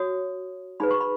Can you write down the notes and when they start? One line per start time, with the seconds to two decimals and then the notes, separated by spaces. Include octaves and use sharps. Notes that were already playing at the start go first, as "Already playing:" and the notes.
Already playing: F#4 C#5 D#6
0.80 D#4 G#4 B4 B5
0.91 C#6
1.01 B5